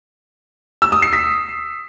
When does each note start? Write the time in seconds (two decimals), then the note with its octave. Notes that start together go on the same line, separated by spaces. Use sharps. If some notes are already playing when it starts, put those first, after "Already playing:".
0.82 E6
0.92 D#6
1.02 C7
1.13 B6